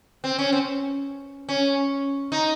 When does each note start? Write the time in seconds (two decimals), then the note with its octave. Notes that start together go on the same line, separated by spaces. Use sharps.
0.24 C4
0.38 C#4
0.52 C4
1.49 C#4
2.32 D#4